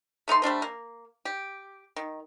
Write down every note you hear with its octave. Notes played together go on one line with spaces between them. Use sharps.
A3 D#4 A4 C6
G3 A3 D4 C5
A#3
G4
D#3